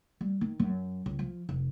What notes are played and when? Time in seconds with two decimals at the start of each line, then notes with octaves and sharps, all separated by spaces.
0.21 G3
0.41 D#3
0.59 F#2
1.06 C#2
1.19 F3
1.49 F1